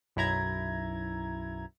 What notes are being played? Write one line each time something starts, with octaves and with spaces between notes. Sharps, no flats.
B1 F#2 E4 A#5 G#6